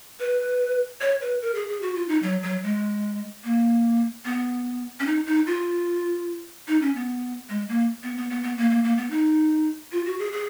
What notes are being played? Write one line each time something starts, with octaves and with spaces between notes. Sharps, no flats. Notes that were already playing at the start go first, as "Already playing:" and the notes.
B4
C#5
B4
A#4
G#4
G#4
F#4
F4
D#4
F#3
F#3
G#3
A#3
B3
C#4
D#4
D#4
F4
D#4
C#4
B3
G#3
A#3
B3
B3
B3
B3
A#3
A#3
A#3
B3
D#4
F4
F#4
G#4
G#4